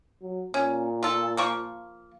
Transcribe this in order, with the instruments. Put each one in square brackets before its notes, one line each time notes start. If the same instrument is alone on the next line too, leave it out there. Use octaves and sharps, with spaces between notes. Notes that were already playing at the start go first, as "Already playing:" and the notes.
[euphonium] F#3
[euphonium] A#2 [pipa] C#4
[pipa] F4 A4
F3 A#3 C#6